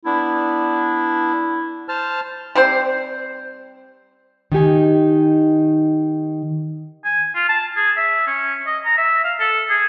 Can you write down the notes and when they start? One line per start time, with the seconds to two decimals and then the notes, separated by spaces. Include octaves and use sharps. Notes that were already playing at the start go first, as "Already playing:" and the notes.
0.06 B3 D4 E4
1.89 C5 A5 F6
2.55 G3 C4 C5
4.52 D#3 D#4 G4 G#5
7.05 G#5
7.35 F4
7.49 A5
7.77 G#4
7.97 E5
8.27 C#4
8.67 D#5
8.85 A#5
8.97 E5
9.24 F5
9.40 A4
9.69 G#4